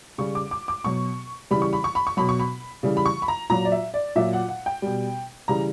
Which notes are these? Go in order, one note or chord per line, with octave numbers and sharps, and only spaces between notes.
C#3 G3 C#6
D6
D6
D6
B2 F#3 C#6
C#3 E3 G3 B5
C#6
B5
C#6
B5
C#6
B2 F#3 B5
C#6
B5
C#3 E3 G3
B5
C#6
B5
A#5
A#2 F#3 A#5
D5
E5
D5
A#2 F#3 E5
F#5
F#5
G5
B2 G3
C#3 E3 G3 A#5